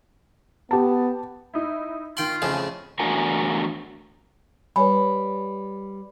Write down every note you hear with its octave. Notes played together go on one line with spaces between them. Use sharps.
B3 G4 A5
D#4 E4
D#3 F4 G5 C6 F#7
F2 A2 C#3 G#4
E2 A3 D4 F#4 A#4 G#5
G3 B4 C#5 G#5 B5